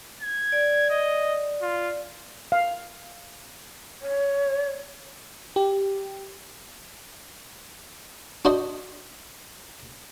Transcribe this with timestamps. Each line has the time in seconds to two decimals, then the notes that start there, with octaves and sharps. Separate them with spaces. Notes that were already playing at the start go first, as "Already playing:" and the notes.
0.22 G#6
0.52 D5
0.90 D#5
1.62 F4
2.52 F5
4.02 C#5
5.56 G4
8.45 D4 F#4 C5 D5 D#5